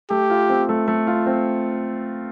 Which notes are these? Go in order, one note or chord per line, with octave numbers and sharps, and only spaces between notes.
A3 G4
F4
C4
A3
A3
F4
C4